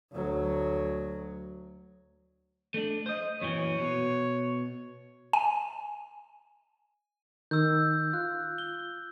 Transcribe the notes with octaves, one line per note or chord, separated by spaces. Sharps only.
D2 F#3
A3 D4
C5 D#5
F#2 A#2 E3 C#5
B2
G#5
D#3 E6 G6
F4 F#6
G7